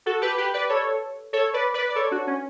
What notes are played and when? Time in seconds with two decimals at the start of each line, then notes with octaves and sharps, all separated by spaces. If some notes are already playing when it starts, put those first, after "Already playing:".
0.06 F#4 A4
0.21 G4 B4
0.38 G4 B4
0.54 B4 D5
0.69 A4 C#5
1.33 A4 C#5
1.54 B4 D5
1.74 B4 D5
1.90 D5
1.96 A4 C#5
2.11 D4 F#4
2.27 C#4